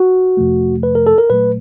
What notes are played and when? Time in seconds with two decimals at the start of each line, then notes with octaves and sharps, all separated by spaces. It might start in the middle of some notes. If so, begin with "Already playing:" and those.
Already playing: F#4
0.37 F2 C3 F3 A3
0.83 B4
0.95 A#4
1.06 A4
1.18 A#4
1.30 A#2 F#3 A3 B4